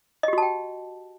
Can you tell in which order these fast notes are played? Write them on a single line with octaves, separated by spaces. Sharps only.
D#5 G4 F#4 A5 G5